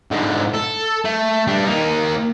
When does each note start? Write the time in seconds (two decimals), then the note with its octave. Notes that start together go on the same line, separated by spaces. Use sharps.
0.11 G#2 D3
0.54 A4
1.05 A3
1.47 G3 D4
1.66 A#3 D#4